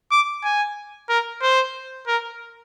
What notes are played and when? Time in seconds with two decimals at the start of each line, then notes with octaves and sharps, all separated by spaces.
0.11 D6
0.44 G#5
1.09 A#4
1.42 C5
2.07 A#4